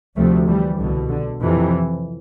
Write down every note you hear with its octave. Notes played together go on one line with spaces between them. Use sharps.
D2 C3 F3 A3
E3 G3
C2 B2 D3
D3
F2 C3 E3